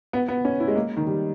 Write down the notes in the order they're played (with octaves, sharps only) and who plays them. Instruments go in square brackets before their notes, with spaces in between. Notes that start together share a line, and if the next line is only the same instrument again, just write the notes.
[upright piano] B3
B3
C#4
E4
G#3
A#3
D#3
G3